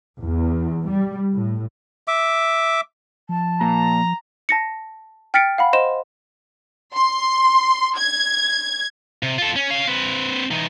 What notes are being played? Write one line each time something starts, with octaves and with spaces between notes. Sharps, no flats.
E2
G3
A2
E5 D6
F3 A5
A#2 A#5
A5 A#6 C#7
G5 F6 A6 B6 C#7 D7
F5 F#5 B5
C5 D#5 C6 E7
C6
G#6
C3
F4 A4
C#4
C#4 F5
C4 B4
E3 D#4